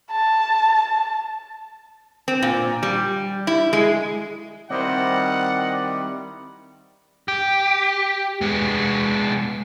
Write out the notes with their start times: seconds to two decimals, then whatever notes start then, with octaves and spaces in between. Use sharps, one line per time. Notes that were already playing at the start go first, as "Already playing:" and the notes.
0.12 A5
2.28 C4
2.42 A#2
2.83 G3
3.47 E4
3.73 G#3
4.70 D#3 G3 C4 E4 C5 D5 D#5 F#5
7.28 G4
8.41 G#3 B3